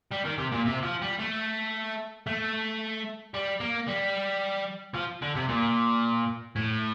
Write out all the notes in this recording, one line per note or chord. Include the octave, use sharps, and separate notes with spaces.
G3
D#3
C3
A#2
C3
F3
G3
A3
A3
G3
A#3
G3
F3
D3
C3
A#2
A2